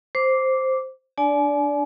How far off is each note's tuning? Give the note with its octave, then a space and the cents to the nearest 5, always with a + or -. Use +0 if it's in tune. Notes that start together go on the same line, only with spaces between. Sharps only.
C5 +0 D6 -10
D4 +0 D5 -20 G#5 +40